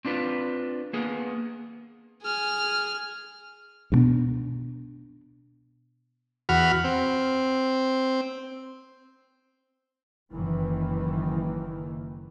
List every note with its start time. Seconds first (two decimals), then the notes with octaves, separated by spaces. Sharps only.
0.05 C4 D4 F4 B4
0.93 A#3 B3 G#4
2.23 G#4 F6
3.92 G2 B2 B3 D4
6.49 E2 F#4 B5 F6
6.84 C4
10.32 F#1 D#3 E3